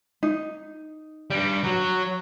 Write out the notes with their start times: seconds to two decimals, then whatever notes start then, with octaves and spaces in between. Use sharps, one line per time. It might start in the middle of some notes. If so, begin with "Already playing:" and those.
0.23 D#4
1.30 G2 G3
1.64 F#3